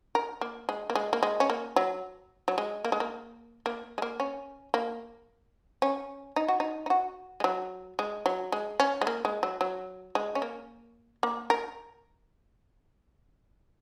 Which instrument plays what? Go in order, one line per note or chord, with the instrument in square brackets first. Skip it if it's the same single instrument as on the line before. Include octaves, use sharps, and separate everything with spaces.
[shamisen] A#4
A#3
G#3
A#3
G#3
A#3
G#3
C#4
A#3
F#3
F#3
G#3
A#3
G#3
A#3
A#3
G#3
A#3
C#4
A#3
C#4
D#4
F#4
D#4
D#4
F#4
G#3
F#3
G#3
F#3
G#3
C#4
G#3
A#3
G#3
F#3
F#3
G#3
C#4
A#3
A#3
A#4